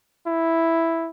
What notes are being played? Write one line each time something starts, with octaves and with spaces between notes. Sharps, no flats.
E4